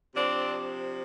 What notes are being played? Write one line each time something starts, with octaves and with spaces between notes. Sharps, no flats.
C3 F3 C4 D4